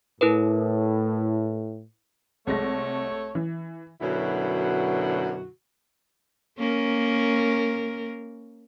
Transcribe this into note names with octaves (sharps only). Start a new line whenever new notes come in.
A2 E4 A#4 B4
C2 G#3 A3 C#5 A#6
E3
F#2 B2 D3 F#3 E4 F#4
A#3 C#4 A#4